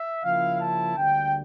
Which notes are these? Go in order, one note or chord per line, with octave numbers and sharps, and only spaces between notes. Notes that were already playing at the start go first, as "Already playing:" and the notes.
Already playing: E5
C#3 F3 A#3 C#4 E4 F5
A5
D2 D3 G3 A#3 G5